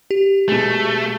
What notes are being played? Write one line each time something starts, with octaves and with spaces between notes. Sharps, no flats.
G4
B2 G#3 A3